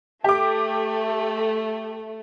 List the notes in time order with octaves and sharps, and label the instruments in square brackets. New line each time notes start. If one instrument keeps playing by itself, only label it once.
[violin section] A3 [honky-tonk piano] G4 D6